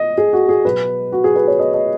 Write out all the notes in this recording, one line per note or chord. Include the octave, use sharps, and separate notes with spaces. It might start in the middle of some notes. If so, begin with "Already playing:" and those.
Already playing: B2 D#5
G#4
F#4
G#4
B2 F#3 B4
F#4
G#4
B4
C#5
D#5
D#5